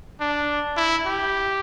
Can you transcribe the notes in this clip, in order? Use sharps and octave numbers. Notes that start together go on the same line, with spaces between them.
D4
E4
G4